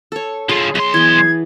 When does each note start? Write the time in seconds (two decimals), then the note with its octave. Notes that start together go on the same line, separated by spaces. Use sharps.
0.12 A4 C#5
0.49 D3 F4 G#4
0.75 B1 G#4 C6
0.94 E3 B3 G#6